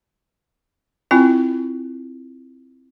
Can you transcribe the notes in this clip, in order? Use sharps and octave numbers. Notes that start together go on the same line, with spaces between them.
C4 E4 F4 G#5